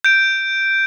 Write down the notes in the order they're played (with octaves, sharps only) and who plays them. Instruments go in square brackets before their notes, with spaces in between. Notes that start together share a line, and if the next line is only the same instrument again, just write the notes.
[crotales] G6 D7